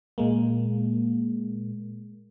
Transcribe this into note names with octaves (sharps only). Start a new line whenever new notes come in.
A#2 G#3 A#3